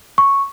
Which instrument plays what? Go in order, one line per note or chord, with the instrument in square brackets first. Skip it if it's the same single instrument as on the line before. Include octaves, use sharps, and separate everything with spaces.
[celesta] C#6